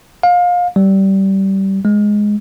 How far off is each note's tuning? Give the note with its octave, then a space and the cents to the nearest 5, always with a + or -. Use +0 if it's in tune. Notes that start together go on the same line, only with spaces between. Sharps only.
F5 +25
G3 -20
G#3 +0